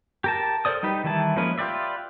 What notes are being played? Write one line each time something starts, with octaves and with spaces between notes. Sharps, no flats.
G4 A#4 A5
A4 A#4 C5 D5 D#6
G3 D#4 G4 B4
D#3 E3 G3 E4 A5
F3 G#3 A#3 C#4 B4
F4 G4 B4 D5 E5